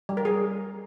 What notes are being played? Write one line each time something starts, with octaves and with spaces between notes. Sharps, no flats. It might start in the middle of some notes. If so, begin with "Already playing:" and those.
G3
A#4
G#4